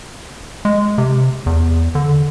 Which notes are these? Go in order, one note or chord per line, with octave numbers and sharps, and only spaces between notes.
G#3
C3
E2
D3